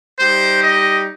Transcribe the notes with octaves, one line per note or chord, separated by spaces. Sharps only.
G3 D#4 G4 C5
D#5